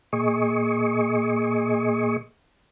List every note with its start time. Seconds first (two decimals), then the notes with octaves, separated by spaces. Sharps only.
0.13 A#2 G#4 D#5 C#6